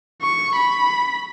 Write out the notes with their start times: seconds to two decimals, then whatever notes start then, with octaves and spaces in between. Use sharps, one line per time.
0.22 C#6
0.56 B5